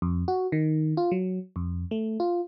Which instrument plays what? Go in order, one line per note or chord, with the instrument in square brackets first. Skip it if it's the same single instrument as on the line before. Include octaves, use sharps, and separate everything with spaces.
[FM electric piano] F2
F#4
D#3
F4
F#3
F2
A3
F4